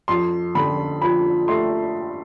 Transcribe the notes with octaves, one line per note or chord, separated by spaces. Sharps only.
F2 C6
D3 B5
F3 B5
A3 C6